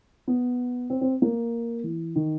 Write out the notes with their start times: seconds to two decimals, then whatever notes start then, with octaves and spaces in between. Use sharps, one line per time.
0.27 B3
0.90 C4
1.01 C4
1.22 A#3
1.84 E3
2.15 D#3